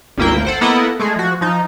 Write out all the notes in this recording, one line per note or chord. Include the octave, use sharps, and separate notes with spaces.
G#1 D2 A#3 E4 G5
A4 C5 F#5
A#3 B3 E4 A4 D#5 F#5
G#3 A3 G#4
F3 F#4
F3 D#4